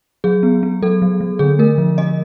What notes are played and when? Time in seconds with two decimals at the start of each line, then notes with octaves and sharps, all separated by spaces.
0.24 F#3 G#4
0.43 B3
0.63 B3
0.82 F#3 A4
1.02 F#3
1.21 F#3
1.39 D3 G#4
1.59 A3 A#4
1.78 F3
1.98 A3 D#5